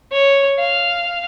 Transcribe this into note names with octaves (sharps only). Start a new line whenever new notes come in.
C#5
F5